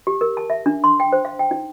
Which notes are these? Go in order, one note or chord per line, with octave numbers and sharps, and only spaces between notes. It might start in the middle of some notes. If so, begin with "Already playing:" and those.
G4
A#4
A5
E5
D4
C6
G5
C5
F5
G5
D#4